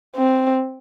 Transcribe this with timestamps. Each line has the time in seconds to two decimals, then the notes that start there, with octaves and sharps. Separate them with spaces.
0.16 C4